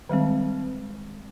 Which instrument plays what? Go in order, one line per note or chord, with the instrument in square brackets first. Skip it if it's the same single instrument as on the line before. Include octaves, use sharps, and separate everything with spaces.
[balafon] D#3 G3 G#3 C4